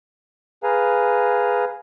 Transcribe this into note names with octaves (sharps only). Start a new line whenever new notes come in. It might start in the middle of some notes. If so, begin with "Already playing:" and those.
G#4 B4 F5 G#5 A#5